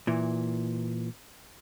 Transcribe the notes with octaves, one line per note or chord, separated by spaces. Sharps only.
A#2 E3